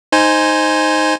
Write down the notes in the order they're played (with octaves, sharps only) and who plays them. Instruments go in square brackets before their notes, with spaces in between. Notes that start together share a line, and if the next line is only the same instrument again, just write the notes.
[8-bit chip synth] D#4 C5 G#5